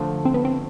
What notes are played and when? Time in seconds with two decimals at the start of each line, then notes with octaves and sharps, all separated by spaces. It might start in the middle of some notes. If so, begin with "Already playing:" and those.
Already playing: D3 F3 A3
0.25 C4
0.34 B3
0.45 C4